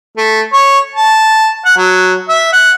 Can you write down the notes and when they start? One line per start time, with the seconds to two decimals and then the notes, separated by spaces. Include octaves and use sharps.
0.17 A3
0.53 C#5
0.95 A5
1.65 F#5
1.77 F#3
2.28 E5
2.52 F#5